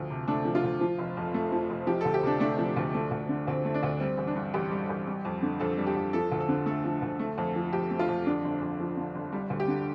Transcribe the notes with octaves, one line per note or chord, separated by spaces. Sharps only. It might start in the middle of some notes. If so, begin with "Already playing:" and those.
Already playing: D2 F3
C3
A3 D4
F3
F4
D2
F3
F1
F2
A3
F3
F1
F3 G4
D2 A4
G4
C3 D4
A3 D4
F3
D2
A3
D2
D3
D2 C4
A3
D4
D2
G3 C4
A1
D4
G2
A1 G4
G3
A1
G3
F2
D3
F2 A4
G3
G4
F2
F3 A4
D2
A4
D3
A3 A4
F3
D2
A3
F2
F3
F2 G4
A3
F4
F2
D3 D4
G1
F2
F3
D3
G1
G3
D2
G4
D3